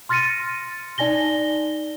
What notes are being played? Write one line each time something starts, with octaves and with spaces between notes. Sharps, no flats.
C6 F6 A6 A#6 C#7 D#7
D#4 D5 G#5 A#6 G7